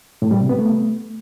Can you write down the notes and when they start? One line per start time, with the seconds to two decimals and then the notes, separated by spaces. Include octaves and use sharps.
0.22 A2
0.31 G3
0.40 C3
0.49 B3
0.59 A3